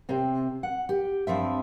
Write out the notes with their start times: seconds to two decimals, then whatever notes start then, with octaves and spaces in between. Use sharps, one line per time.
0.09 C3 C4
0.63 F#5
0.89 G4
1.27 G2 F3 C4 E5